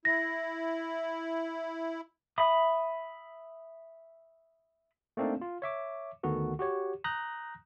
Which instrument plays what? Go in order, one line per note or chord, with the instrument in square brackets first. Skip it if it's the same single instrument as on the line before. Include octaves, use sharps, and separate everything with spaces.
[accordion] E4 [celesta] A#6
[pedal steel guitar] E5 B5 D#6
[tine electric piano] A3 A#3 C4 D4 D#4
F4
C#5 E5 D6
D2 D#3 B3 F#4 A4
F#4 G4 C#5
A#5 D#6 F#6 G6 A#6